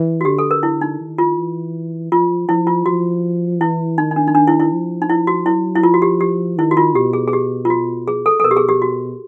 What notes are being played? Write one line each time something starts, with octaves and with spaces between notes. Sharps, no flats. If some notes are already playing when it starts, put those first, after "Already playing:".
Already playing: E3
F#4
D3 G4
A4
A#4
E4
D#4
D#3
F4
E3
F3 F4
F3 E4
F4
F3 F#4
E3 E4
D#3 D#4
D#4
D4
D#4
D4
E4
E4
F3
D#4
E4
F#4
F#3 E4
E4
F3 F4
F#4
G4
G4
D#3 E4
F#4
F4
B2 G4
G#4
G#4
G4
F4
F#4
G#4
A4
A4
B2 A#4
G4
G#4
G4
F#4